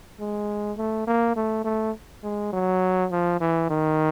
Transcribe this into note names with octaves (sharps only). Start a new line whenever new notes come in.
G#3
A3
A#3
A3
A3
G#3
F#3
F3
E3
D#3